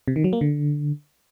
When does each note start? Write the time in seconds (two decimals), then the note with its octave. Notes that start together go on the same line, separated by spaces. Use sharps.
0.08 C3
0.16 D#3
0.24 F#3
0.33 A#3
0.41 D3